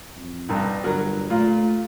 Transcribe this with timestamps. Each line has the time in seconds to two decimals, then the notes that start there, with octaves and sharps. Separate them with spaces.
0.16 F2
0.49 B1 G2
0.84 G1 F#3 A#4
1.30 A#2 A3 F4